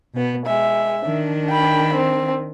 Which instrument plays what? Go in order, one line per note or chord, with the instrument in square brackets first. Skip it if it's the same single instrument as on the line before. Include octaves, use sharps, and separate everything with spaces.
[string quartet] B2 B3
[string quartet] G#3 [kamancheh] E5
[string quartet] D#3 D4
[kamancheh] G5 B5
C4